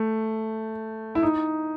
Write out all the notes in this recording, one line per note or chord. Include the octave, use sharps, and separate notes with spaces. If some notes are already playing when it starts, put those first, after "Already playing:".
Already playing: A3
E4
D#4